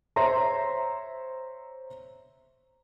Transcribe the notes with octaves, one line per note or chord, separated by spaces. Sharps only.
C5 C#5 E5 A#5 C6